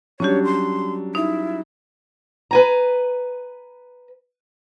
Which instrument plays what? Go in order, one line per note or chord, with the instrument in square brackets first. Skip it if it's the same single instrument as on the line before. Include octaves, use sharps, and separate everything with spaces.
[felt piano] F#3 G3 D4 [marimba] C#4 G4 [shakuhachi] C#5
[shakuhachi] C6
[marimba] D#4 [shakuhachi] E4
[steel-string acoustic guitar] B4 G#5 A#5